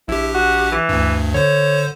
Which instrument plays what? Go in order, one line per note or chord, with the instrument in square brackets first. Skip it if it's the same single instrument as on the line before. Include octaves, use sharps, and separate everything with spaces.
[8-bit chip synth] A#1 G4 [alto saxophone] E4
[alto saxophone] F#4
E3
[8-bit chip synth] D2 G2
[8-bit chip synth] D3 C5 [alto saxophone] C#5